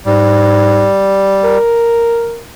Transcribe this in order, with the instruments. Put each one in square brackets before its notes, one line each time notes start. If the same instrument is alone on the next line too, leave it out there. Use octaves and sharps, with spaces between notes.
[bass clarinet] G#2 [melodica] G3
[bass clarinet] A#4